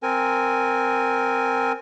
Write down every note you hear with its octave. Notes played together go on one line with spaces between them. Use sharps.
C4 A#4 G#5